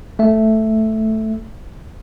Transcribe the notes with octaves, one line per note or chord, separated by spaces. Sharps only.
A3 E5